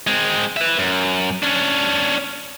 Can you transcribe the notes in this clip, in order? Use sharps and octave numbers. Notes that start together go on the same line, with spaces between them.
G#3 C4
B4 E5
F#2
C#4 D4